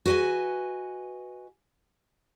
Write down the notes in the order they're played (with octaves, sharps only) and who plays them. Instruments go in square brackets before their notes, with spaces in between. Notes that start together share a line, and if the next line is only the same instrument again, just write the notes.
[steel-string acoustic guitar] F#4 B4 C5 D#5 G#5